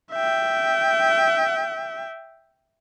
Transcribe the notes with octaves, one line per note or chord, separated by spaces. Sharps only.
E5 G5